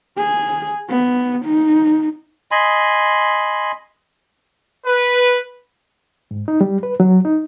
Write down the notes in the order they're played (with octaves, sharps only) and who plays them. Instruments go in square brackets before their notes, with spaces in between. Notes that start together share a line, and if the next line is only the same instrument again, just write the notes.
[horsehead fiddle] G#4
B3
D#4
[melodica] D#5 G#5 B5 C6
[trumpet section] B4
[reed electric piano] G#2
D#4
G3
B4
F#3
D#4